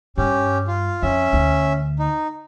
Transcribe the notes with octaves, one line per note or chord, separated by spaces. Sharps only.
G2 C#4 G4
F4
F2 C#4 E5
D2
D#4